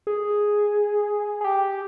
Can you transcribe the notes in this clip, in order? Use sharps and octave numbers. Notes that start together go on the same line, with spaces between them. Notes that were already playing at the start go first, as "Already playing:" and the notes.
G#4
G#4
G4